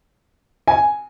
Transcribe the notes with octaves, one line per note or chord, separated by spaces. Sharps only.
G#5